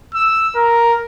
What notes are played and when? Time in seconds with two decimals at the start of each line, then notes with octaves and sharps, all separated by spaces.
0.14 E6
0.56 A#4